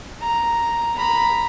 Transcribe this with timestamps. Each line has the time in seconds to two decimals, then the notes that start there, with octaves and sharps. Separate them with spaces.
0.21 A#5
0.96 A#5 B5